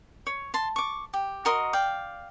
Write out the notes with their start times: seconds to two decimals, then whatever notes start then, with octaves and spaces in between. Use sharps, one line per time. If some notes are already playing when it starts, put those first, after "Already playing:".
0.27 C#5
0.54 A5 C6
0.76 C#6 D6
1.14 G4
1.45 F#4 A#4 D#5 C6
1.73 D5 F5 G5